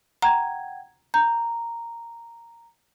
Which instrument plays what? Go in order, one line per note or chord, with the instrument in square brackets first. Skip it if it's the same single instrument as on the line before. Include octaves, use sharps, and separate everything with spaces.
[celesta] F#5 G5 G#6 [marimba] A#5
[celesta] A#5 [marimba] G6